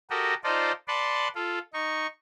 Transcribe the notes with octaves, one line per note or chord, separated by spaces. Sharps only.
F#4 G4 A4 A#4 D#5
D#4 F4 A4 C5 D5 D#5
B4 D5 F#5 A5 C6
F4 A4
D#4 C#6